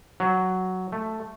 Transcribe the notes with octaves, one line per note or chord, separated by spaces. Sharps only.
F#3
A3